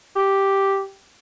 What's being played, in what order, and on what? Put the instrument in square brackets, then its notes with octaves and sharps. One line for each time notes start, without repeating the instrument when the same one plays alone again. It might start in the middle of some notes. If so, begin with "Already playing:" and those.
[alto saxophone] G4